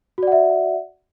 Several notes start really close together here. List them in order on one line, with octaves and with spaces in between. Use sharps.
F#4 D5 F#5 E5